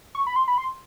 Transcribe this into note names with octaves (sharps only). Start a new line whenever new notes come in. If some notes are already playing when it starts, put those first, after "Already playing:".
C#6
B5
C6
B5
C6